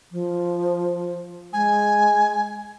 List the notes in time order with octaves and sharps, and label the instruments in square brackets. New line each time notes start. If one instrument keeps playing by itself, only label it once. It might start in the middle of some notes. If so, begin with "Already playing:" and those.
[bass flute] F3
[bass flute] G#3 [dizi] G#5